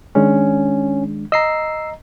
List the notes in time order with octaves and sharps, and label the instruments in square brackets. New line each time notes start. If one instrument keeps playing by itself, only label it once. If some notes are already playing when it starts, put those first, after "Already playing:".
[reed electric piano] D#3 G#3 D4 [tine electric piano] C#4
[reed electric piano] D#5 A#5 [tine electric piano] E6 C7